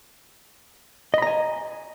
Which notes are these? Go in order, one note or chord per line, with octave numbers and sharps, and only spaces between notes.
D#5 G#5 A#5 B5